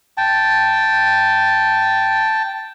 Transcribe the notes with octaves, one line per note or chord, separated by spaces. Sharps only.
G5 A5